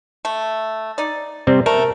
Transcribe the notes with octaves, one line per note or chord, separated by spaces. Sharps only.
A3
D#4 D5
C3 G3 C4
A3 A#4